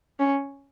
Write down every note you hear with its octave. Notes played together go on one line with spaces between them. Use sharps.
C#4